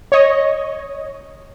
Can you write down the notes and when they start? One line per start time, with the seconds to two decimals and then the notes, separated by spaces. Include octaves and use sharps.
0.12 C#5 D#5